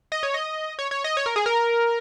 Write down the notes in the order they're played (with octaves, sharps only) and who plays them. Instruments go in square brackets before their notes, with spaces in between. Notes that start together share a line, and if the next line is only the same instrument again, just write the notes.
[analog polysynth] D#5
C#5
D#5
C#5
C#5
D#5
C#5
A#4
G#4
A#4